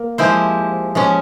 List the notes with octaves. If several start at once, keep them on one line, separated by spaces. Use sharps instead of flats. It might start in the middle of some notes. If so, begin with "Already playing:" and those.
Already playing: A#3
F3 G#3 E4 G4 C5
F3 G#3 C#4